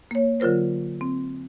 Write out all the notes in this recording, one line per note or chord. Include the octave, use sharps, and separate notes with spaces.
A#3 C#5
D3 F#3 F4 A#4 C5
C4